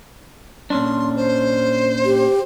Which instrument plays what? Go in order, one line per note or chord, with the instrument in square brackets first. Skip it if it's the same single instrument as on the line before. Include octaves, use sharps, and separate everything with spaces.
[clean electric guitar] A#2 C#4 D4 [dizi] C6
[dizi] C5
[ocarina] G4